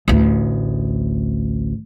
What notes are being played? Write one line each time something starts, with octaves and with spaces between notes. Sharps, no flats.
A1 D2